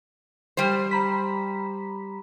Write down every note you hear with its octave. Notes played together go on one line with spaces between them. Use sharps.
G3 C5
A#5 B5 B6